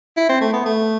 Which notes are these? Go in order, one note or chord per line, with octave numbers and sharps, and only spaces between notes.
E4
C4
A3
B3
A3